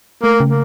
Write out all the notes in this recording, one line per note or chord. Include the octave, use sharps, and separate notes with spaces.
A3 A#3
C#3
A#3